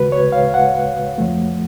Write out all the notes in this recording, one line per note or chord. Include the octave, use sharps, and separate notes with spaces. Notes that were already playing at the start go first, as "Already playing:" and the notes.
Already playing: D2 C#3 G#3 F#4 B4
C#5
F5
F#5
F2 F3 A3